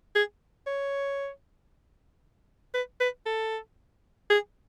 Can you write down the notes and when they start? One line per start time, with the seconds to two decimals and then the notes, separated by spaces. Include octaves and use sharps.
0.15 G#4
0.67 C#5
2.74 B4
3.00 B4
3.26 A4
4.30 G#4